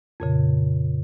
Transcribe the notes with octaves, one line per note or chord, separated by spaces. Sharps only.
F2 A#2 C#3